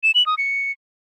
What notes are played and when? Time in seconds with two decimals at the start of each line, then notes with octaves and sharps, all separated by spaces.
0.03 E7
0.15 F#7
0.26 D#6
0.38 C#7